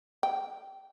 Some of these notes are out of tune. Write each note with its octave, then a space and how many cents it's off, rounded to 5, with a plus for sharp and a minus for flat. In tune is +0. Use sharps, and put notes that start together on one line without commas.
G5 -20